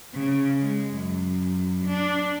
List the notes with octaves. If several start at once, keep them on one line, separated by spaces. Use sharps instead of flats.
C#3
G#3
F#2
D4